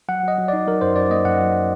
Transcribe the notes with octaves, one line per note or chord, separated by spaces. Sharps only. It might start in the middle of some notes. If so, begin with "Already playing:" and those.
F#3 F#5
F#3 D#5
F#3
D#4 D5
F#3 A#4
F#2 C5
F#2 D5
A#3 D#5
F#2 F#5
F#3